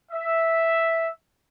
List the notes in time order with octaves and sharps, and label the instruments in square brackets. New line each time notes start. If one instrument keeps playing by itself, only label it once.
[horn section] E5